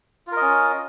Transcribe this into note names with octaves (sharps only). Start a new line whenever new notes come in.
C#4 F4 A#4 D#5